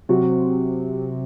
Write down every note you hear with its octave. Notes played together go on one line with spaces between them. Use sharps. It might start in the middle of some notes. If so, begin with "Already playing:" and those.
C3 F#3 F#4